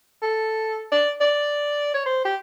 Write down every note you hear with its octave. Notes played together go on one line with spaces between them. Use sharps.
A4
D5
D5
C#5
C5
G4